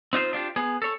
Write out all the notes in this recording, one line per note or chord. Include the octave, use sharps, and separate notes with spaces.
C4 D#4 F4 C5
D4 F4 G4
B3 G#4
A4 C#5